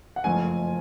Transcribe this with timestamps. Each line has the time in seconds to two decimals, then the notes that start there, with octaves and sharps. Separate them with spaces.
0.16 F#5
0.24 F#1 F2 F3 A3 C#4 G#5